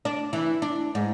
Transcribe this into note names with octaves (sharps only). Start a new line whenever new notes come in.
D4
E3
D4
G#2